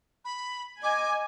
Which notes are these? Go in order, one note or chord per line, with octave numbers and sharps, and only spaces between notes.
B5
D#5 G#5 D6